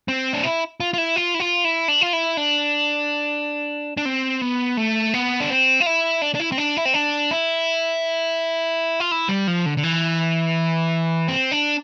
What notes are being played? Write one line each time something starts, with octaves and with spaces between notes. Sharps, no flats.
C4
D4
E4
F4
F4
E4
F4
E4
F4
E4
D4
F4
E4
D4
D4
C4
B3
A3
B3
D4
C4
F4
E4
D4
D4
E4
C4
D4
E4
C4
D4
E4
F4
E4
G3
F3
D3
D3
E3
C4
D4